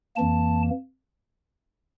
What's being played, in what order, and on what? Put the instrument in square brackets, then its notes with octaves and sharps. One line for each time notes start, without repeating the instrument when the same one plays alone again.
[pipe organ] F2 E3 A#3 A5